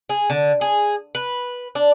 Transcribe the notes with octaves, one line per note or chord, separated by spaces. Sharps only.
G#4
D3
G#4
B4
D4